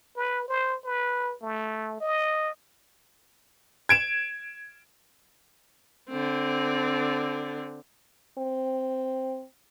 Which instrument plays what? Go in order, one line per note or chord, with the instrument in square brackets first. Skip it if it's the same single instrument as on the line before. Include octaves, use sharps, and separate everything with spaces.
[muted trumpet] B4
C5
B4
A3
D#5
[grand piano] G#6 D7 E7
[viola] D3 C4
[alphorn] C4